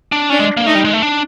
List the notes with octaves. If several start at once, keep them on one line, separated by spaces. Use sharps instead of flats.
D4
C#4 D4
G#3
A#3
A3 D#4
G3
G#3
A3
D4